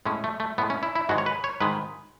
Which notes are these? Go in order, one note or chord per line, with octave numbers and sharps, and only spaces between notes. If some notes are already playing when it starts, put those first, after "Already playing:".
A2 G#3 C#4
A3
A3
A2 G#3 B3
C#4
E4
E4
G#2 D#3 G#3 F#4
C#5
B4
C#5
G#2 D#3 G#3 B4